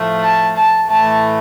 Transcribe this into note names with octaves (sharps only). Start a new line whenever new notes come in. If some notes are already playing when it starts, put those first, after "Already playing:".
Already playing: A2 F3 A3
A5
A5
A2 E3 A3 A5